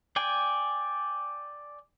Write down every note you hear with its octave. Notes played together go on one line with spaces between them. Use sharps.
D5 G5 G#5